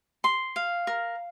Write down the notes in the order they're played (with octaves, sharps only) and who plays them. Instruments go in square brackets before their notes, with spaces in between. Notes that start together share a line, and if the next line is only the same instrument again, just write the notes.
[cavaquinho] C6
F5
A#4